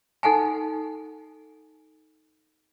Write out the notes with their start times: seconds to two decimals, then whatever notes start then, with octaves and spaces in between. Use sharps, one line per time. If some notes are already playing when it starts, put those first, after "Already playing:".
0.23 D#4 A4 F#5 G#5 A5